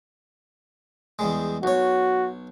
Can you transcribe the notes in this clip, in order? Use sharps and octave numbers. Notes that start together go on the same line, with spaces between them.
E2 G3 G#3
B1 F#4 C#5